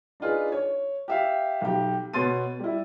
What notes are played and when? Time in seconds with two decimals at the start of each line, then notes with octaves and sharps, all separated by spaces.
0.20 D4 D#4 F4 G#4 B4
0.52 C#5
1.08 G4 E5 F5
1.61 B1 G4
2.14 B2 B3 C#5 C6 A6 D#7
2.60 G3 E4